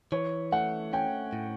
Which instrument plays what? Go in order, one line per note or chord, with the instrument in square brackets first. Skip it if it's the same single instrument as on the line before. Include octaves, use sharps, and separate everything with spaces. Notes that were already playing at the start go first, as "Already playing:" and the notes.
[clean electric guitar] E3 [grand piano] C#5
[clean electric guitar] A3 [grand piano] F#5
[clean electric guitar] C#4 [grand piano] G5
[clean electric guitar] A2